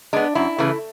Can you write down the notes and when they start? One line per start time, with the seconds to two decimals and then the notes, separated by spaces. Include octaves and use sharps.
0.13 G#3 B3 D4
0.35 F#2 E4
0.58 C#3 E3 A3